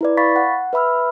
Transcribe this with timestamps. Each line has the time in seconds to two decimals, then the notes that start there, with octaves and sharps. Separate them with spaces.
0.01 E4 B4 D5
0.17 F5 B5 C#6 A6 B6
0.36 F#5
0.73 B4 E5 B5 E6 F6